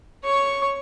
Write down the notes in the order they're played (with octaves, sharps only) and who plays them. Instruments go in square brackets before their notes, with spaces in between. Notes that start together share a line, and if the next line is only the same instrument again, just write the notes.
[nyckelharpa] C#5 C#6